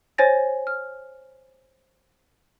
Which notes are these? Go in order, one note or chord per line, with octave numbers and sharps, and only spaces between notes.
C5 C#5 G#5 A6 A#6
F6